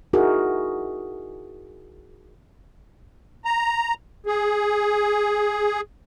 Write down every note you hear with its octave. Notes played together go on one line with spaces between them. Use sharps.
D#4 E4 F#4 G#4 A#4
A#5
G#4